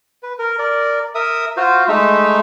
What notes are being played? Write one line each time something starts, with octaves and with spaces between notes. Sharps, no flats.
B4
A#4
A#4 D5
A#4 E5 D#6
F4 F#4 C5 F5
G#3 A3 D#4 E5